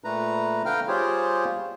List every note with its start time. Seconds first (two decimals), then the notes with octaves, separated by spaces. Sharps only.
0.04 A#2 A3 B4 A#5
0.66 D3 B4 F5 G5 A#5 F6
0.88 G3 F4 G4 G#4 C5 C#5